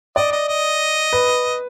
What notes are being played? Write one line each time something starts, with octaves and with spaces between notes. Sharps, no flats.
D5 D#5
D#5
D#5
B4